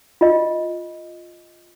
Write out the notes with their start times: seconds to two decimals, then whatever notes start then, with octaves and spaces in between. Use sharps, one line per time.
0.21 F4 D#5